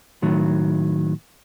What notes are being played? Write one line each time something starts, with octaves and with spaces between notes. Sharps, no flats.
A2 D#3 F#3